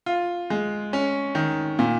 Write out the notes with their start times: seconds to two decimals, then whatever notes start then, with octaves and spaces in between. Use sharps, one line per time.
0.06 F4
0.50 G#3
0.93 C#4
1.35 D#3
1.79 A#2